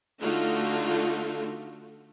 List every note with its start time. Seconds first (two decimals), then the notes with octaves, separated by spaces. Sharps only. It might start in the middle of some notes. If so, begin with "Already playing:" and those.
0.20 D3 A3 D#4 F4 F#4